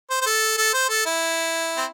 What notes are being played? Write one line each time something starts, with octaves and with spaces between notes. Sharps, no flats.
C5
C5
A4
A4
C5
A4
E4
C4